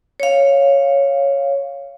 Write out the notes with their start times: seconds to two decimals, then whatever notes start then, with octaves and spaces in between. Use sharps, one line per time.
0.20 C#5 F5